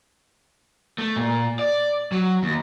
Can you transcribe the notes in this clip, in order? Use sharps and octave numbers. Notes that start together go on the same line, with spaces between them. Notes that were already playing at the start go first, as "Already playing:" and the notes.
A3
A#2
D5
F#3
D#2